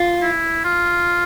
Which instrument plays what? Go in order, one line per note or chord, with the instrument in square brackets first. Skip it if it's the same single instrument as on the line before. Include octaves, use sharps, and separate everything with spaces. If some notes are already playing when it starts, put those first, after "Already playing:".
Already playing: [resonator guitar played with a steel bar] F4
[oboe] E4
F4